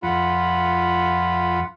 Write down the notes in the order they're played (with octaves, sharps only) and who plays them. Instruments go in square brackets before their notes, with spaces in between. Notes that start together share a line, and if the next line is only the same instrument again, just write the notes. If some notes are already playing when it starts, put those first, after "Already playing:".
[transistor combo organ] F2 [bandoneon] F4 F#5 B5